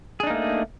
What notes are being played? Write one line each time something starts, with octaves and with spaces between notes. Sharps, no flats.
A3 A#3 D4 D#4 G#4